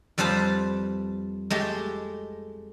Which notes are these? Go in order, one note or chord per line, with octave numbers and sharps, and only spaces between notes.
F2 G3 B4 C5 A5
G#3 A3 G4